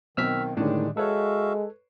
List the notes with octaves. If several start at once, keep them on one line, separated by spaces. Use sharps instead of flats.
B1 B2 D#3 C4 E6 F6 B6
A2 D3 D#3 G3 G#3 C#4 D4
G#3 F#4 A4 B4 C#5 E5 F5